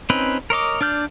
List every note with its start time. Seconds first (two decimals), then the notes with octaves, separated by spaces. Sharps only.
0.10 C4 C#4 D#4 B4
0.50 A#4 C#5 D#5 D6
0.81 D4 D5 F6 G6